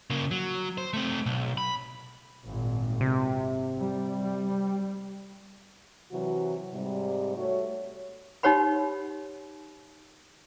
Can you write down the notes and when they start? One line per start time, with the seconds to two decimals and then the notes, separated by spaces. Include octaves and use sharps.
0.10 C#3 A#3
0.31 F#3
0.78 C5
0.94 A3 C4
1.26 B1
1.58 B5
2.46 G#1 A#2
3.01 C3
3.77 G3
4.23 G3
6.12 C3 E3 F#3 F#4
6.73 G#2 C3 G3
7.36 A3 F#4 C#5
8.43 D#4 G4 C#5 F#5 B5